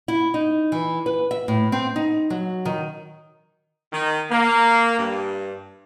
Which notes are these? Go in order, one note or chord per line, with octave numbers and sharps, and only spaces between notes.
E4
D#4
E3
B4
E5
A2
C4
D#4
F#3
D#3
D#3
A#3
G2